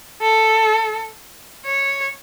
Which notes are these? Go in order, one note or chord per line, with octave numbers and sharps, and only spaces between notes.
A4
C#5